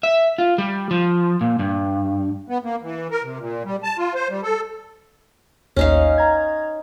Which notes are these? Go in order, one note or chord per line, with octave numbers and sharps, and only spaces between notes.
E5
F4
G3
F3
A#2
G2
B3
A#3
E3
A#4
C3
A#2
G3
A5
F4
C5
G3
A4
A1 D#2 C#4 D#4 F5
A#5 G#6